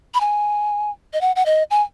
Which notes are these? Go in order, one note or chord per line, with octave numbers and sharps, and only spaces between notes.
B5
G#5
D#5
F#5
F#5
D#5
G#5